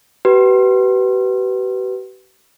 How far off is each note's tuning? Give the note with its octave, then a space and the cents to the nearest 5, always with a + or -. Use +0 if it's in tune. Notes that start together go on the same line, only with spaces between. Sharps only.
G4 -45 B4 +0